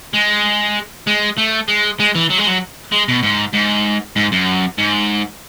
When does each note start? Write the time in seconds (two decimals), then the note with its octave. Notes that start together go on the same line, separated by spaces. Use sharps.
0.13 G#3
1.07 G#3
1.38 A3
1.68 G#3
2.00 G#3
2.15 E3
2.30 F#3
2.38 G#3
2.47 F#3
2.92 G#3
3.08 B2
3.23 G#2
3.54 G#2
4.16 G#2
4.32 F#2
4.78 G#2